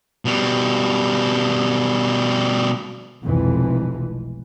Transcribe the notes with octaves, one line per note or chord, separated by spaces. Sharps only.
B2 G3
F1 B1 F2 E3 G#3